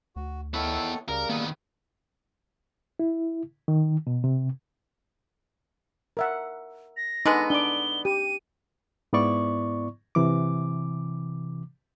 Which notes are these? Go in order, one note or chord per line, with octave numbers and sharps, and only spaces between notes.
D2 F#4
D#3 B3 E4 A4 C#5
C#2 C#3 G3 A#4
D#3 A#3 B3
E4
D#3
B2
C3
A#4 E5 F#5
A#6
D3 G#3 B3 D#4
D4 D6 G7
G4 D#7
G#2 B3 E4 D5 C#6
C3 E3 D6